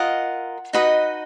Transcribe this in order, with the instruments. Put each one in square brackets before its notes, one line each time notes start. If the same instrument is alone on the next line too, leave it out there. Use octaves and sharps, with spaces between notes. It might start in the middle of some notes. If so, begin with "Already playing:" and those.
Already playing: [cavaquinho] F4 A#4 D#5 F#5
D#4 F#4 B4 D#5